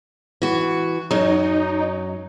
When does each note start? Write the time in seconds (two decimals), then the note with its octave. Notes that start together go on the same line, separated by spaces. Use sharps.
0.42 E3 F#4
1.11 F#2 F#3 D#4